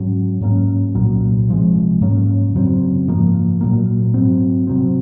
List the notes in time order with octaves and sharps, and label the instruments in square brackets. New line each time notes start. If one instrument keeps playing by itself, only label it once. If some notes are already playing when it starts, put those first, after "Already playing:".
Already playing: [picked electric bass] G#2 F#3 C#4
G#2 F#3 A#3 C#4
C2 A#2 F#3 A#3
C3 F3 G#3
G#2 F#3 A#3 C#4
F#2 C#3 F#3 C4
G#2 F3 A#3
A#2 F#3 A#3
G#2 F#3 C4
C3 F#3 C4